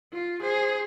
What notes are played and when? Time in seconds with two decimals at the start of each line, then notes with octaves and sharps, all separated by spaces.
0.13 F4
0.42 G#4 C5